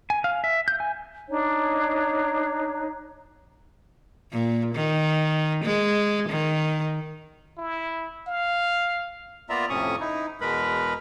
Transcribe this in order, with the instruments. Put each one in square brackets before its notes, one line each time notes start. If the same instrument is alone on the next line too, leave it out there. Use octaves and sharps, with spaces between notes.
[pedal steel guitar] G#5
F5
E5
G6
G#5
[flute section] D4 D#4 C#5
[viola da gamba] A#2
D#3
G#3
D#3
[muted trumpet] E4
F5
[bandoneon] A#3 B3 F4 D5 E5 A#5
F2 A2 C3 C#4 C#6 D#6
D#4 E4
E2 B2 G#3 A#4 B4 B5